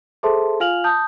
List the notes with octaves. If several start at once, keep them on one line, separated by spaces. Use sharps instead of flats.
G#4 A4 C5 E5 A5 C6
F4 F5 G#5 F6 F7 F#7
A5 D#6 G6